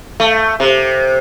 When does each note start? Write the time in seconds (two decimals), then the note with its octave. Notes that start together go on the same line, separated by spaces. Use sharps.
0.20 A3
0.60 C3